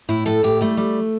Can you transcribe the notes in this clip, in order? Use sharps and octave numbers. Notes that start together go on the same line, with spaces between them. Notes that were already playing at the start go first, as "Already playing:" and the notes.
A2 E4
A2 A4
A2 G4
G3 A3
G3